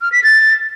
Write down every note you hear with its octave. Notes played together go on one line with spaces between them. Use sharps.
F6
B6
A6